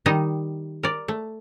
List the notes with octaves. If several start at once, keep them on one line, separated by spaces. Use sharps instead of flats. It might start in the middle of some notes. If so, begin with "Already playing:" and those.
D#3 G3 D#4 D#5
A#4 D5
A3